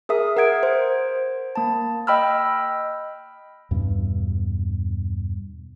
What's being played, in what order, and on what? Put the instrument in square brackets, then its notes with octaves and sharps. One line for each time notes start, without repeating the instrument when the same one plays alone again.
[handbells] G#4 A#4 E5 D#6
A#4 F#5 G#6 D7
C5
A#3 A5
D#5 G5 B5 E6 F6
[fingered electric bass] E2 G2 B2